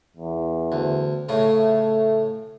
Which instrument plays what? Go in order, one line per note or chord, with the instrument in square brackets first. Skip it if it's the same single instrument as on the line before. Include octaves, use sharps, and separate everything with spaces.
[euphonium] E2
[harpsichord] D2
[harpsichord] A2 C#3 [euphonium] A3